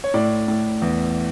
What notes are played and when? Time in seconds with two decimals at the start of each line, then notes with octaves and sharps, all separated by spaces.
0.04 C#5
0.14 A2 D5
0.48 A2
0.82 E2